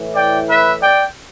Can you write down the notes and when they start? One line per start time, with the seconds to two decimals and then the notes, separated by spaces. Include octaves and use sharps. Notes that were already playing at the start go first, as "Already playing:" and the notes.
Already playing: A2 E3
0.15 D5 G5
0.50 B4 E5
0.83 D5 G5